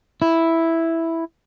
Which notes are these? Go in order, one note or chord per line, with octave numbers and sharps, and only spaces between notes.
E4